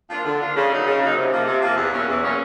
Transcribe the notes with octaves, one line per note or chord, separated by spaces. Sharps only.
F3 A#3 D4 F4
D3
F3 A#3 D4 F4
C#3
F#3 A#3 D#4
C#3
F#3 A#3 D#4
C3
F3 A#3
C3
F3 A#3
E2
B2 F#3 A#3 C#4
E2
B2 F#3 A#3 C#4